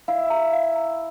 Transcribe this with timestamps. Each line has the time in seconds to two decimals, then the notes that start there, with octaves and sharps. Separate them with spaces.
0.08 E4 F5
0.30 A#5
0.53 F5
0.76 A#5